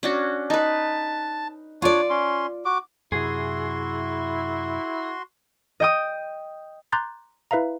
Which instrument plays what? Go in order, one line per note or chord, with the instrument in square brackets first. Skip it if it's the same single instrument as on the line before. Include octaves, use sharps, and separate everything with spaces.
[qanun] C#4 D4 F#4
[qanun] D#4 B4 [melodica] A5
[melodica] D4 C#5 [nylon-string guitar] F4 D5
[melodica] C#4 C6
F#4 D6
[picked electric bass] F#2 C3 [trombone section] E4 [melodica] F#4 C6 [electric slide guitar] G#4
[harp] D#5 G5 D#6
[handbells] A#5 C6 D6 F#6 G6 A6
E4 B4 E5 F5 A#5